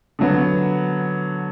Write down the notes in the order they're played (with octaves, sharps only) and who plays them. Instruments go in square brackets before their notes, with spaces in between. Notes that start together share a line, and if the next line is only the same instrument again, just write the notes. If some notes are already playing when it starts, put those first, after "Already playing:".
[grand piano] D3 F#3 B3